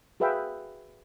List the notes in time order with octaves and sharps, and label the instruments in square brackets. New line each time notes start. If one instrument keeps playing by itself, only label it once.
[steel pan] F#4 G#4 B4 E5 F5 G5